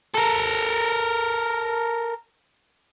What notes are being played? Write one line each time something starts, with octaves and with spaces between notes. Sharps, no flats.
A4 A#4